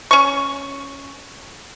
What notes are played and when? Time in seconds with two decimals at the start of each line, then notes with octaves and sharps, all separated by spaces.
0.11 C#4 C#6